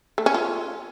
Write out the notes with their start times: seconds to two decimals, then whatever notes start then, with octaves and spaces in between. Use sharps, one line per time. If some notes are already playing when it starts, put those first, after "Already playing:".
0.18 A3
0.26 C#4
0.34 F4